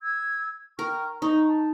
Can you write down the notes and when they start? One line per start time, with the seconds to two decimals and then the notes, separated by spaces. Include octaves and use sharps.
0.02 E6 G#6
0.79 A#4 G5 C#6 F6
1.22 D#4 C#6
1.48 A5